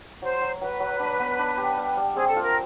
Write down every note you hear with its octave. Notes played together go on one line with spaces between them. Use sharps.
F#3 C5
F#3
F#3 B4
F#3
D4
B3
D4
G4
G3
G3
C4 G#4
A4
F4
A#4